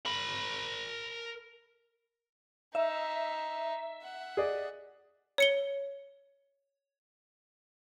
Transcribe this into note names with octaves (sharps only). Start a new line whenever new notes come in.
A#4 B5
D#4 E5
F#5
G#4 D5 D#5
C#5 C#7 G7